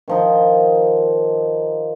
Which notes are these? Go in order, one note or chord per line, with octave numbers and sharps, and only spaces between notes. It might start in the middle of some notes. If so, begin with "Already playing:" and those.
D#3 F3 D#4